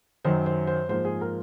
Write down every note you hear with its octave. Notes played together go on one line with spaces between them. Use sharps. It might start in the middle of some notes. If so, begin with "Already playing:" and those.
F#2 D#3 F#3 C5
C5
C5
G#2 F3 A#3 C5
G#4
A#4